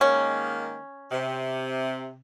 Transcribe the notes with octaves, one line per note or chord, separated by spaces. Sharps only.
D#3 G#3 A#3 C#4
C3